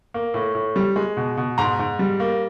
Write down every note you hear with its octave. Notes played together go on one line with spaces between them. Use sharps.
A#3
A2
A2
G3
G#3
B2
B2
G#2 A#5 C6
G#2
G3
A#3